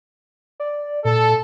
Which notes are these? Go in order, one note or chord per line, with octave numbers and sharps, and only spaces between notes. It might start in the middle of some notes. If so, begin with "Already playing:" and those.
D5
A#2 A4